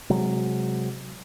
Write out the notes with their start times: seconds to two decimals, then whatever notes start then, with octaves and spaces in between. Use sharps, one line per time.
0.10 C3 F#3 G#3